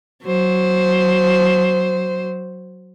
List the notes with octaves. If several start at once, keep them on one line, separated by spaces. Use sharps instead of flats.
F#3 C5